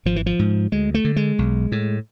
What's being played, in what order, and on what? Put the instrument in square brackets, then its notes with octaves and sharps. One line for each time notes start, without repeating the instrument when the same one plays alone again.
[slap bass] G#1 F3
E3
F3
G#2
D2 G#3
A3
D3
G#3
B1
A2